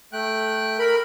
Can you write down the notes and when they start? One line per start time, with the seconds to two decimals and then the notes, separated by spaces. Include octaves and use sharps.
0.13 A3 G5 F#6
0.79 A#4 B5